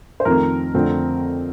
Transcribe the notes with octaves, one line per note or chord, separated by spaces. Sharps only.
C5
F2 D#3 A3 C4 A#4
F2 D3 A3 C4